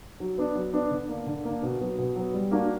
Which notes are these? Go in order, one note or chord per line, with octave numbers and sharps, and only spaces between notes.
F#3
B3 D4
F#3
B3 D4
D3
A#3 D4
D3
A#3 D4
B2
F#3 B3
B2
F#3 B3
G3
A#3 D4 F#4